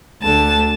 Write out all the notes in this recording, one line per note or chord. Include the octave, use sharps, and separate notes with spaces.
D2 D3 A5